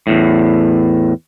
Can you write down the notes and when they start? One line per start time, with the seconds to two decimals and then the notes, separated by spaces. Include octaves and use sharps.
0.07 E2 A2